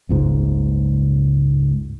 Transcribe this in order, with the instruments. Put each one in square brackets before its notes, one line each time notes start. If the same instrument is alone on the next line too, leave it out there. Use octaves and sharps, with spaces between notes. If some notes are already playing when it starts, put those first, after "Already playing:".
[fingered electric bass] F#1 C#2 G#2